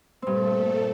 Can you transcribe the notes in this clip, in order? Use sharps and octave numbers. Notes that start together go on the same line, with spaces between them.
G2 A#2 A3 C4 A4